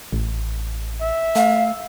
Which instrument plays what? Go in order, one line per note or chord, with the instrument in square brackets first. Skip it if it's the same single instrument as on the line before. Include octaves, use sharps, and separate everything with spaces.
[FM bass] A1
[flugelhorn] E5
[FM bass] A3 [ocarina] F5